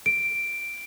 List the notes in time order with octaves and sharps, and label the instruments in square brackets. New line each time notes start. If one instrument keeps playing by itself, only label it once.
[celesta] D7